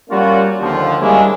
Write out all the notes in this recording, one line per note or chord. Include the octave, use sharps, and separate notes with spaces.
G3 A#3 C#4 F4 F#4
D#2 D3 F3
G3 G#3 A#3 C#4 D4 E4